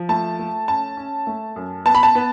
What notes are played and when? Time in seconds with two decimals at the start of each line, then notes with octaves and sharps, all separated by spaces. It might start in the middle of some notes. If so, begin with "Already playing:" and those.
Already playing: F3
0.09 A3 A5
0.39 A3
0.68 C#4 A5
0.97 C#4
1.27 A3
1.56 F#2
1.85 B3 A5
1.95 B5
2.03 A5
2.15 B3